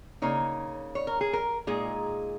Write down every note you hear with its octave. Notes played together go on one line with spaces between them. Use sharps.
C#3 A#3 D#4 C#5
C#5
A#4
G#4
A#4
A#2 G#3 D#4 G#4